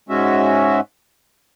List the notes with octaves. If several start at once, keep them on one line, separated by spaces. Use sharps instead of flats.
G#2 G#3 C#4 F#4 E5